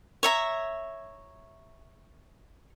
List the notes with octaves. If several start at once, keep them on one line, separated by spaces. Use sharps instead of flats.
C#5 E5 A#5